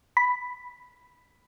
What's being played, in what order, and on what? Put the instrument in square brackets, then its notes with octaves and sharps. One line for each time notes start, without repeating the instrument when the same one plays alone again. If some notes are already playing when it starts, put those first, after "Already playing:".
[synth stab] B5